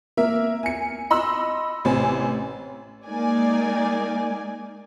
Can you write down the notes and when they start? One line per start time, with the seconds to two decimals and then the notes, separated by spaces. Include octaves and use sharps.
0.17 A#3 A#4 E5
0.63 G#5 C#7
1.10 D#5 B5 C6 E6
1.85 A1 C3 C4 G#5
3.07 G#3 A#3 D#4 D5 G#5